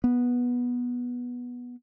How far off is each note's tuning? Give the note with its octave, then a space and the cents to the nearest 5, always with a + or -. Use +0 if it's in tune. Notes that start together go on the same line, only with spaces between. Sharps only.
B3 -10